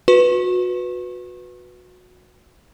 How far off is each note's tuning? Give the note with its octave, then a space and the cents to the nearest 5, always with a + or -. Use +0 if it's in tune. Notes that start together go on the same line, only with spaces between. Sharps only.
F#4 -25 B4 +0 C#6 -35